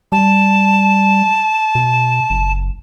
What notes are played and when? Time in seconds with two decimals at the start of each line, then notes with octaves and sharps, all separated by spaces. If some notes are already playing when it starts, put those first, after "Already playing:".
0.12 G3 A5
1.75 B2
2.30 F#1